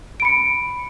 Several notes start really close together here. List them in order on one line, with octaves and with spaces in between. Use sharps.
D7 B5 C#7